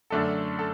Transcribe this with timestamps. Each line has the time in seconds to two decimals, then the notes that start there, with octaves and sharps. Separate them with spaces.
0.10 F#2 D3 A3 D4 A4
0.59 A4